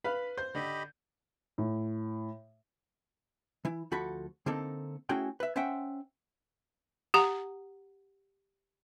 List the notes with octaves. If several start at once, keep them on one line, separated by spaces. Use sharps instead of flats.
B4 F5 B5
C5 G6
D3 G4 D#5 B5
A2
E3 E4
D2 F3 F#4 A4 B5
D3 A#3 C4 D#4 A4
A3 C#4 E4 F#4 G#4 G5
B4 E5
C#4 C5 E5 F#5 G5
G4 F#5 A#5